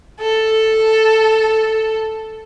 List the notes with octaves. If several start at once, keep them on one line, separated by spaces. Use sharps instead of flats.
A4